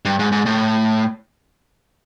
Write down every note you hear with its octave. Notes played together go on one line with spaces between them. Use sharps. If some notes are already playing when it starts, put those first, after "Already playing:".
G2
G#2
G#2
A2